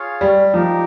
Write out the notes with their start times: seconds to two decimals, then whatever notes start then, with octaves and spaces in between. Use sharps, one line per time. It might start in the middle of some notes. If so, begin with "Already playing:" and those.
Already playing: F4 G#4 C#5 F5
0.21 G3
0.54 F3 D#4 G4 A#4